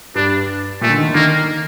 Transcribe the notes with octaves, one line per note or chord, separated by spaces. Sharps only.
G2 D4
A#2 A3
D3
D#3
D3
D#3 A#3